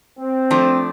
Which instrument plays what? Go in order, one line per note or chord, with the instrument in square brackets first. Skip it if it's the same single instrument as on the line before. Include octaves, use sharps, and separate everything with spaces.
[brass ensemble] C4
[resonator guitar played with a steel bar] F3 A3 D4